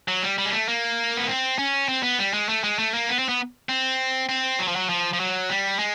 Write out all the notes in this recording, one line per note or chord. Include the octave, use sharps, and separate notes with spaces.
F#3
G3
G3
G#3
A3
A#3
B3
C4
C#4
C4
B3
G3
G#3
A3
G#3
A3
A#3
B3
C4
B3
C4
C4
F#3
F3
F#3
F3
F3
F#3
G3
G#3